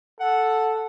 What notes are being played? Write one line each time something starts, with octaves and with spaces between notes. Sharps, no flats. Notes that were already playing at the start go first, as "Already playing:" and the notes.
A4 F#5